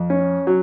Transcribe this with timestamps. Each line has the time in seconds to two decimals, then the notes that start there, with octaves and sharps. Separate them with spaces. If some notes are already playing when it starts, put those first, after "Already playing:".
Already playing: F2
0.10 C#4
0.47 F#3